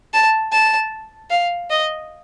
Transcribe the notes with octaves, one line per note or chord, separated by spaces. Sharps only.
A5
A5
F5
D#5